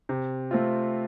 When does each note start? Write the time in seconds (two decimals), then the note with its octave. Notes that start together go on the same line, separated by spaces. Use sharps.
0.09 C3
0.51 A3 C4 F4